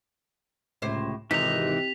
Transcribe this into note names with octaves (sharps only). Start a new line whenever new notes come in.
C#2 A2 C3 C5
G#1 C3 E3 D#4 B6 F7